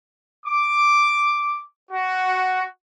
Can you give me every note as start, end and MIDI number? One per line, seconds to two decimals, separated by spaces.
0.46 1.62 86
1.90 2.63 66